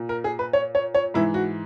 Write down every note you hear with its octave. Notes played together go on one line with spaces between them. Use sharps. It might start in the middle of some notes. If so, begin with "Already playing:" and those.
Already playing: A#2
A#4
G#4
B4
C#5
C#5
C#5
G#2 E3 E4
F#4